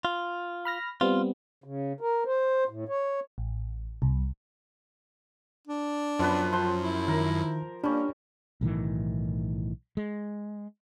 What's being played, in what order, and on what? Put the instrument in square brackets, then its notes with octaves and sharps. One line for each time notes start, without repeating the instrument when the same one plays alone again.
[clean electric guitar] F4
[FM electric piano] B5 F6 A#6
[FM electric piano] G3 B3 C4 [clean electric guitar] F4
[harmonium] C#3
A#4
C5
A2
C#5
[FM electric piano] A1
C2
[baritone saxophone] D4
[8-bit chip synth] F#2 [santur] F3 B3 B4
[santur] F3 C5 C6
[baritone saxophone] E4
[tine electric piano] D#3 [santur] A#4
[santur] G3 C#4 [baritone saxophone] A#3 [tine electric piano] D4
[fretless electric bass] B1 A2 D#3 E3
G#3